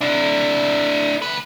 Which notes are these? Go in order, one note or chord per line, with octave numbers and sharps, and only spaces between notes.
D4 E4
D2 B4